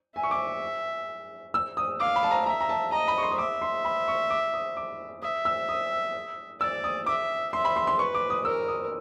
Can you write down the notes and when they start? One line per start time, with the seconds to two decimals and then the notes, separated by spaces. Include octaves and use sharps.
0.16 E5 G#5
0.23 C#6
0.31 D6
1.54 E6
1.77 D#6
2.00 F5 D6
2.16 B5
2.23 A5
2.31 A#5
2.46 E5 A#5
2.61 A#5
2.69 A5
2.92 D#5 A#5
3.08 B5
3.18 C#6
3.23 C6
3.31 D#6
3.38 E5 D6
3.62 C6
3.85 B5
4.08 C#6
4.30 D6
4.54 D#6
4.77 D6
5.22 E5 D#6
5.45 E6
5.69 D#6
6.61 D5 E6
6.84 D#6
7.06 E5 D6
7.53 E5 C6
7.65 B5
7.76 C6
7.87 C6
7.99 B4 C#6
8.15 D6
8.30 D#6
8.45 A#4 E6
8.68 D#6